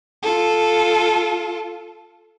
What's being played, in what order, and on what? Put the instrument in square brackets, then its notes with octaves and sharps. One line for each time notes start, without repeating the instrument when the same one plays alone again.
[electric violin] F4 A4